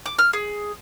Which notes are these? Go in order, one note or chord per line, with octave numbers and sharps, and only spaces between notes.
D6
F6
G#4